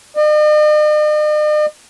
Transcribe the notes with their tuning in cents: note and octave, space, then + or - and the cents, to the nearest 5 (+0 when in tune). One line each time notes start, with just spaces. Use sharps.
D#5 -45